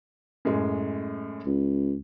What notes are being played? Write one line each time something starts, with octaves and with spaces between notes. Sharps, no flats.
F#2 A2 G#3
C#2